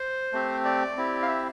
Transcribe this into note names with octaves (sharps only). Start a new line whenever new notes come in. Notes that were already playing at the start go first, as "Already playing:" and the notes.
Already playing: C5
A3 C4 G4
D5
C4 E4 G4
F5
E5